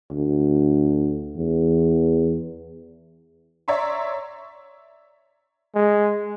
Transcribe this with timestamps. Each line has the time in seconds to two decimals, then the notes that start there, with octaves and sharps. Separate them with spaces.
0.11 D2
1.36 E2
3.68 C#5 D5 E5 A#5 C6
5.75 G#3